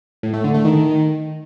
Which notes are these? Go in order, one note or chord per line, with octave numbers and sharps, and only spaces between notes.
A2
A3
D3
A3
D#3